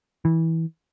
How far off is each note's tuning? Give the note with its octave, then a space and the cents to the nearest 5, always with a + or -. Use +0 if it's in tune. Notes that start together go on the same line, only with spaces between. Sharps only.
E3 -20